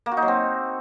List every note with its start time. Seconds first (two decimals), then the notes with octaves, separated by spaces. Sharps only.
0.06 A#3
0.12 F#4
0.17 D#4
0.22 F#3
0.28 C4